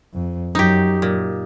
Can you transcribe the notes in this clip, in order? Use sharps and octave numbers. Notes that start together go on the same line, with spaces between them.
F2
F#2 F#3 D#4 G4
A#2